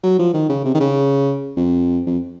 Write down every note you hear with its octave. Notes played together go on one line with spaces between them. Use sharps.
F#3
F3
D#3
C#3
C3
D#3
C#3
F2
F2